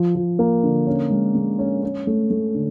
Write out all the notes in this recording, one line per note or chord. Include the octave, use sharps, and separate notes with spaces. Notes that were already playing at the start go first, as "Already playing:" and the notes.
Already playing: F3
F3
A#3
D3
C#4
G#3
G#3
C#4
C#4
A3
A3
D3